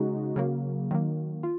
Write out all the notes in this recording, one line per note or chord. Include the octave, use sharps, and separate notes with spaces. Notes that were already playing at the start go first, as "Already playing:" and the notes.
Already playing: C#3 G#3 D#4 F#4
C#3 F#3 A#3
D#3 F#3 A#3
F4